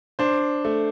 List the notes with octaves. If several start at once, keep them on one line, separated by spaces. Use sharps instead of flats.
D4 C5
A3